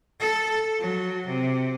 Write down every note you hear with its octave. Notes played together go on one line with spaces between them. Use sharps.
A4
F#3
C3